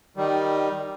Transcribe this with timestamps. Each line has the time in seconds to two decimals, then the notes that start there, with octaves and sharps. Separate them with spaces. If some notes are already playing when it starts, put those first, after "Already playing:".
0.17 D#3 G3